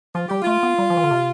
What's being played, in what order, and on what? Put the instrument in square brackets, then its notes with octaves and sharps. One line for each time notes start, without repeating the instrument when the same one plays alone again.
[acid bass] F3 [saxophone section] F4
[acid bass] G3 [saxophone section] G4
[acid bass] A3 [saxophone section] F4
[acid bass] B3
G3
F3
E3
D3
C3